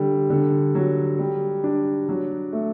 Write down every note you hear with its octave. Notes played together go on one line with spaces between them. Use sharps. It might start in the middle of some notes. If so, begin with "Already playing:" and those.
Already playing: D3 G3
D3
F#3
G3
D4
F#3
A3